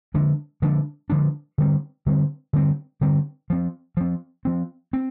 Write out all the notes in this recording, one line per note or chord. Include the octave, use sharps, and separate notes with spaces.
D3 F3 G#3 D4
D3 F3 G#3 D4
D3 F3 G#3 D4
D3 G3 C4
D3 G3 C4
D3 G3 C4
D3 G3 C4
F3 C4
F3 C4
F3 C4
C4